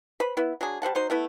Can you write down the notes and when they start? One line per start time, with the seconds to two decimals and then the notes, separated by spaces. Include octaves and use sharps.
0.20 B4 C5 B5
0.37 B3 E4
0.61 F#3 D4 G#4
0.82 G3 C5 F#5 A5
0.95 F#3 D#4 C5
1.10 A3 B3 E4